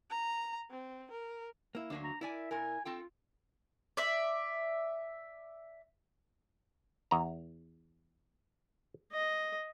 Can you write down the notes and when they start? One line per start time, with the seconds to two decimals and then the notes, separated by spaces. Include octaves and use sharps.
0.10 A#5
0.70 C4
1.11 A#4
1.75 A#3 E4
1.90 D2 F#3 A#3 D4
2.04 A#5
2.21 E4 A#4 D5 E5 G#5
2.51 A#2 A#4 G#5
2.85 C4 F4 A4 G5
3.97 D5 E5
7.11 E2 A#5
9.12 D#5